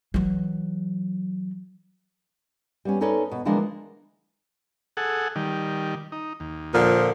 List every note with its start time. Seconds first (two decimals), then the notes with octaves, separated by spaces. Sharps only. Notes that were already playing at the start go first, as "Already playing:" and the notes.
0.14 E3 F#3
2.85 G3 B3 C#4
3.01 C#4 D#4 A4 B4 C#5 D5
3.31 B2
3.45 D3 E3 F3 G#3 A#3 D4
4.97 G#4 A4 F#5
5.36 D#3 G3
6.12 D#4
6.40 D#2
6.73 A#2 D3 F3